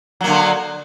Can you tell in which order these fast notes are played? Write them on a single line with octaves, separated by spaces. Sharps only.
F#3 A#3 D3